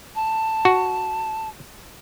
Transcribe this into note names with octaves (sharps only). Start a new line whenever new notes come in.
A5
F#4